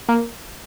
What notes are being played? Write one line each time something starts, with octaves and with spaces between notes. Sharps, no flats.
A#3